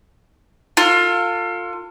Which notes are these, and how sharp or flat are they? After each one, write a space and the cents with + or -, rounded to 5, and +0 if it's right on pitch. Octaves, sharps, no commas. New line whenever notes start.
F4 +15 A4 +40